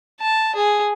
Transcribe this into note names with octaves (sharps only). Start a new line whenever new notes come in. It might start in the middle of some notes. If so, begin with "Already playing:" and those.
A5
G#4